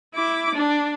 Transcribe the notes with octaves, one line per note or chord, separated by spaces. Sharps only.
E4 D6
D4